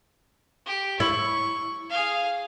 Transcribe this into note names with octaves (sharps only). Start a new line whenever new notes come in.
G4
E4 C#6
G#4 F5